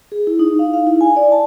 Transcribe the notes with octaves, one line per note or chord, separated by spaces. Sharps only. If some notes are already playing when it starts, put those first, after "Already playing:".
G#4
E4
D#4
F5
F5
E4
G#5
D5
A5